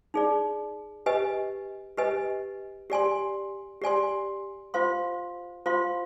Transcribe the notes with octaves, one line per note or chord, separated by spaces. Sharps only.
D#4 G#4 D5
G4 B4 D#5 G#5
G4 B4 D#5 G#5
G4 D5 G#5 C6
G4 D5 G#5 C6
F4 C5 F5 C6
F4 C5 F5 C6